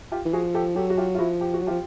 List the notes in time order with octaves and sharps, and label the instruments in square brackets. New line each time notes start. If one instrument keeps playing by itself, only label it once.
[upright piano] F4 G4
[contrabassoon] E3
[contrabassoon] F3 [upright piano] F#4 G#4
[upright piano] G4 A4
[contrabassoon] F#3 [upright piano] G4 A4
[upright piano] F#4
F4 G4
F4
[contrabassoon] F3 [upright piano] E4 F#4
[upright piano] G4
F#4
[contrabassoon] F#3
[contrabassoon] F3 [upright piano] F4 G4